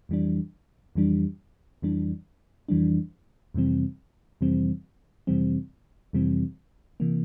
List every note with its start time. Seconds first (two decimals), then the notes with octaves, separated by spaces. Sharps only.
0.09 F2 E3 G3 D4
0.95 F2 E3 G3 D4
1.82 F2 E3 G3 D4
2.69 F2 E3 G3 D4
3.54 F2 C3 E3 G3 C4
4.41 F2 C3 E3 G3 C4
5.27 F2 C3 E3 G3 C4
6.13 F2 C3 E3 G3 C4
7.00 C3 E3 A#3